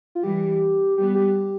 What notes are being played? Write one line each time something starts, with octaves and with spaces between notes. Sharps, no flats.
F4
E3 G3 G4
G3 B3 G4
G4